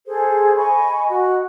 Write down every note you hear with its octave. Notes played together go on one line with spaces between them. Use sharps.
G#4 A4 C5
D#5 G#5 B5 C#6
F#4 D#5